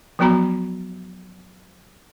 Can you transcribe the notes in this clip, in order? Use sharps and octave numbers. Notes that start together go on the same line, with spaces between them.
F3 F#3 B3 F#4 A#5 B5